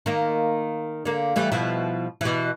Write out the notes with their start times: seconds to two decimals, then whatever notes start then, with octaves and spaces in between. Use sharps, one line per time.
0.06 D#3 A#3
1.05 D3 A#3
1.36 E3 G3 A3
1.52 B2 F3 E4
2.21 B2 E3